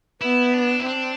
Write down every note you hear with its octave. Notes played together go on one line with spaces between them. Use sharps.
B3 E4
D4
E4
C4 D4